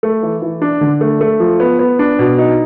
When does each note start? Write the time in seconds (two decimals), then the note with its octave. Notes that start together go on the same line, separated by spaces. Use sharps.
0.03 A3
0.23 E3
0.42 E3
0.62 D4
0.81 D3
1.01 A3
1.21 A3
1.40 F3
1.60 B3
1.79 B3
1.99 D4
2.19 B2
2.38 D#4